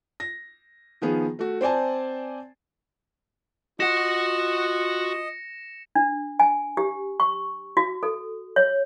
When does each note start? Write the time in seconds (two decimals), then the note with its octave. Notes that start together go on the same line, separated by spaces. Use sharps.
0.20 A#6
1.02 D#3 F3 B3 G#4
1.39 A3 F#4
1.61 C4 C5 D5 G#5 A5
3.80 F4 F#4 D#5 F#5 A#6 C#7 E7
5.95 D4
6.39 G#5
6.77 G4
7.20 C#6
7.77 F#4
8.03 A4
8.56 C#5